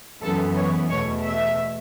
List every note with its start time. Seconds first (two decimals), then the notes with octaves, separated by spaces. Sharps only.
0.23 F#2 E3 B3 A4
0.56 C#5
0.89 E2 B2 A3 C#5
1.24 E5